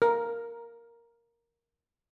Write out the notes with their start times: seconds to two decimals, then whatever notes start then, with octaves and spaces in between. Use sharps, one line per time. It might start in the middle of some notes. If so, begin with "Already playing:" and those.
0.02 A#4